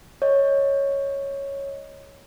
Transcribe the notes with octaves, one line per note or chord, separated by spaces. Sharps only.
C#5 D#5